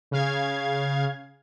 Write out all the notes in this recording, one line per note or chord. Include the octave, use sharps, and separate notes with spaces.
C#3 F5 G#6